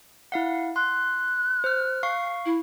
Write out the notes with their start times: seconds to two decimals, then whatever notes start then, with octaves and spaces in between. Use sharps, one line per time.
0.32 E4 F5 F#5
0.76 C6 F#6
1.64 C5 F6
2.03 F5 C#6 C7
2.46 E4